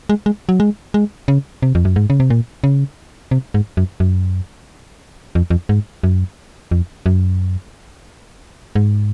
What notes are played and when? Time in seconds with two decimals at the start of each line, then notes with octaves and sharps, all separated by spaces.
0.09 G#3
0.26 G#3
0.49 F#3
0.60 G#3
0.94 G#3
1.28 C#3
1.62 C3
1.75 F2
1.85 F#2
1.96 G#2
2.10 C#3
2.20 C3
2.30 A#2
2.64 C#3
3.31 C3
3.54 G#2
3.77 F#2
4.00 F#2
5.35 F2
5.50 F2
5.69 G#2
6.03 F#2
6.71 F2
7.06 F#2
8.75 G#2